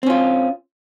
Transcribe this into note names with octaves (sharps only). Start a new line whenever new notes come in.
C4 C#4 F4